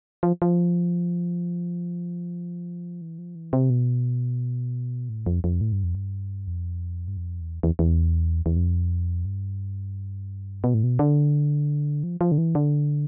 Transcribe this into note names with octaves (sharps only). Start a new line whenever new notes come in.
F3
F3
E3
F3
E3
C3
B2
A2
F2
F2
A2
G2
F2
G2
F2
G2
F2
E2
E2
E2
E2
F2
G2
B2
A2
B2
D3
F3
F3
D3
E3
D3